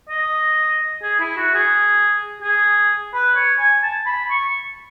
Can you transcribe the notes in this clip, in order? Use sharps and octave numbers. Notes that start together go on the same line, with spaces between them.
D#5
G#4
E4
F#4
G#4
G#4
B4
C#5
G#5
A5
B5
C#6